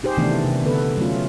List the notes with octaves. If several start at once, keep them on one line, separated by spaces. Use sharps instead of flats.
D#4 G4 G#4 C5
C3 D#3 E3 A3 B3 D4
C3
D3 B3 A4 B4
F#3 A3 C#4 F4